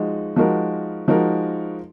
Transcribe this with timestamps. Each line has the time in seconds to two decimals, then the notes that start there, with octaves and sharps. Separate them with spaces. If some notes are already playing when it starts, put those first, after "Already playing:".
Already playing: F3 G#3 D#4 F#4
0.36 F3 G#3 D#4 F#4 A#4
1.08 F3 G#3 D#4 F#4 A#4